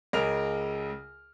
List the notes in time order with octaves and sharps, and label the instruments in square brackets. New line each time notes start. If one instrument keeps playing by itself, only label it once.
[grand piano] C#2 C#3 A#4 F6 F7